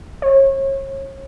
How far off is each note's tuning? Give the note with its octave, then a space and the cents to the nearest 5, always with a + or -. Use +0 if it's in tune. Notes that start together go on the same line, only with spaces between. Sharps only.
C#5 -35